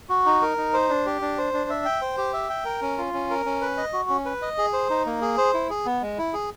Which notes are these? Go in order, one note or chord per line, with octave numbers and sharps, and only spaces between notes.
F#4
D#4
A#4
D#4
C5
D4
G4
D4
C5
D4
E5
G5
C5
G4
E5
G5
A#4
C#4
F4
C#4
A#4
C#4
B4
D#5
F#4
C#4
B4
D#5
G#4
C5
D#4
A#3
G#4
C5
E4
G#4
B3
G#3
E4
G#4